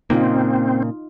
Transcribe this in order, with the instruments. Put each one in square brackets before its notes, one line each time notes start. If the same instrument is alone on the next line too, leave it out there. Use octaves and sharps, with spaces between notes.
[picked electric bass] A#2 C#3 A#3 [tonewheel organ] C4 [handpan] D#4 F4